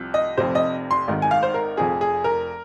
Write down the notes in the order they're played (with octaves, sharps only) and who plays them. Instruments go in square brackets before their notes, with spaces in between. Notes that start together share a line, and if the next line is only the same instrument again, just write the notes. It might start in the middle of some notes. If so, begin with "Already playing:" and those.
Already playing: [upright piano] C2 C3 F3
D#5
F1 F2 C3 C5
D#5
C6
G#1 G#2 D#3
G#5
F5
C5
A#4
F1 F2 F3 G#4
G#4
A#4